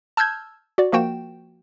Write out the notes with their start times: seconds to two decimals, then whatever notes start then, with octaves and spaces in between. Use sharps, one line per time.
0.17 A5 E6 F6 G6 G#6
0.78 F#4 D5
0.92 F3 A#3 F#4 G5 E7